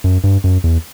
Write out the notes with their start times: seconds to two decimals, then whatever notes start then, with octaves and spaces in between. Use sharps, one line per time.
0.04 F#2
0.24 G2
0.44 F#2
0.64 E2